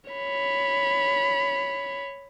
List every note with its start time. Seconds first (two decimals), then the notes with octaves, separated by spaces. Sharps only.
0.10 C#5 B5